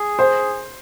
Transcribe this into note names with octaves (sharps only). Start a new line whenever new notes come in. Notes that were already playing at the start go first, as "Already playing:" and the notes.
Already playing: G#4
C5